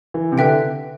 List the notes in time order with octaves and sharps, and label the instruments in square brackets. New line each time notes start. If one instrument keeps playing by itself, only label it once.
[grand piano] E3
C3
[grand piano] D3 [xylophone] G4 B4 E5 G5